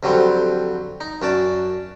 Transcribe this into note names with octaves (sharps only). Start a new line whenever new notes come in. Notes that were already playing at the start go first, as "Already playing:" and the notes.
F2 D3 F#3 G3 C4
D#4
F#2 C#4 D5 A5